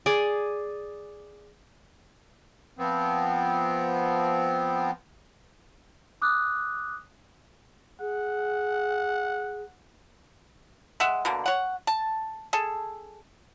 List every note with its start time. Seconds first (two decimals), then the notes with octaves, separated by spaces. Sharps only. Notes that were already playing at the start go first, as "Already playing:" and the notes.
0.06 G#4 D5
2.79 F3 B3 C4
6.22 D6 D#6 F#6
8.00 G#4 F#5
11.00 G#3 E5 F#5
11.25 B2 D3 A#3
11.46 C#5 F#5
11.87 A5
12.53 G#4 A4